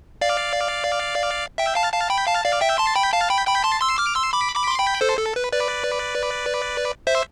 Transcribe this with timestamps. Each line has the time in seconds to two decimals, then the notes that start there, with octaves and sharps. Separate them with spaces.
0.21 D5 F5
1.58 E5 G5
1.75 F5 A5
1.93 F5 A5
2.10 G5 B5
2.27 F5 A5
2.44 D5 F5
2.61 E5 G5
2.78 A5 C6
2.95 G5 B5
3.13 F5 A5
3.30 G5 B5
3.47 G5 B5
3.64 A5 C6
3.81 C6 E6
3.98 D6 F6
4.15 C6 E6
4.33 B5 D6
4.55 B5 D6
4.67 C6
4.78 G5 B5
5.01 A4 C5
5.18 A4
5.36 B4
5.52 B4 D5
7.07 C5 E5